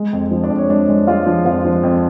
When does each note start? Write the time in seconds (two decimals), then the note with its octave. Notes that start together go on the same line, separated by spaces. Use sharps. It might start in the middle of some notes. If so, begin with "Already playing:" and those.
Already playing: G#3
0.13 F2
0.31 F3
0.43 D4 D5
0.50 F2
0.58 C#5
0.69 G#3 D4 D5
0.89 G#3
1.07 G#3 F4 F5
1.27 F3
1.45 F2 F4 F5
1.65 F3
1.83 F2